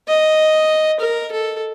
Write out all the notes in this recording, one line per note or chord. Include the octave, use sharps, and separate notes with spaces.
D#5
A#4
A4